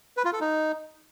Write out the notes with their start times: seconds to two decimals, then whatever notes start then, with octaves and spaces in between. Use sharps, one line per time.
0.17 B4
0.25 F4
0.33 A4
0.41 D#4